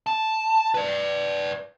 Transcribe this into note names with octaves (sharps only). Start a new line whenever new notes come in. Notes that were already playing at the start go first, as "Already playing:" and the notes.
A5
B4 D5